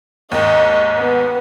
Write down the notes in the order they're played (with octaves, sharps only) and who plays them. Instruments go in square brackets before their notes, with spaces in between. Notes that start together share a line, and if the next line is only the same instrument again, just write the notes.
[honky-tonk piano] D#2 G#2 [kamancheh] D#5 C#6
[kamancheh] B3